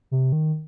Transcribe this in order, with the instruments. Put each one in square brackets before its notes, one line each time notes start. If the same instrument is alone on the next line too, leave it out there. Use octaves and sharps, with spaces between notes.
[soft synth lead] C3
D#3